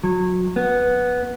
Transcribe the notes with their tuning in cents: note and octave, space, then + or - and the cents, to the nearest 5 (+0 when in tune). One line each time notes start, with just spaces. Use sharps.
F#3 -25
B3 -5